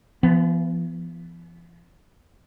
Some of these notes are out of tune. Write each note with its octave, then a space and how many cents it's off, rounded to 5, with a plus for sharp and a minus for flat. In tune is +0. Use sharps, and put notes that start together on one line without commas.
F3 -45 B3 +0